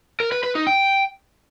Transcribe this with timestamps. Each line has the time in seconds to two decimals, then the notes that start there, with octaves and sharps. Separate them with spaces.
0.20 A#4
0.32 B4
0.43 B4
0.55 D#4
0.67 G5